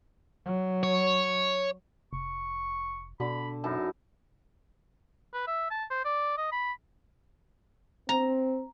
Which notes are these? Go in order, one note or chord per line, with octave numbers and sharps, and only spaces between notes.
F#3
C#5
F1 C#6
B2 D3 B5
F#2 D#4 E4 A5
B4
E5
A5
C5
D5
D#5
B5
C4 A#5